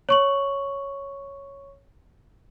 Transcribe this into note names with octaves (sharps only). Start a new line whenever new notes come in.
C#5 C#6 F#7